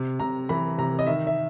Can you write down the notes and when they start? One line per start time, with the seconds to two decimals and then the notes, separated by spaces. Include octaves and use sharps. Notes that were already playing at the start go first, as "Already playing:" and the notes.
Already playing: C3
0.20 C3 A#5
0.49 E3 B5
0.78 C3 A#5
0.99 D#5
1.06 D#3 E5
1.27 E5